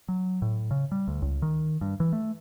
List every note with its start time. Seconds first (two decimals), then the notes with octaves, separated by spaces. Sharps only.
0.09 F#3
0.42 A2
0.71 C#3
0.92 G3
1.08 D2
1.22 C#2
1.42 D#3
1.81 G2
2.00 E3
2.13 A3